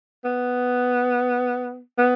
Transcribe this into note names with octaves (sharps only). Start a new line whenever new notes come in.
B3
B3